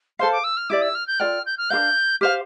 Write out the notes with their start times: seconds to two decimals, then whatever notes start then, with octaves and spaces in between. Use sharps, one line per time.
0.19 A4 C5 F5 C6
0.32 D6
0.44 E6
0.57 F6
0.70 E4 G4 D5 D6
0.82 E6
0.95 F6
1.07 G6
1.20 F4 A4 D5 G5 F6
1.46 G6
1.58 F6
1.70 D4 F4 A#4 F5 G6
2.21 G4 C5 F5 F6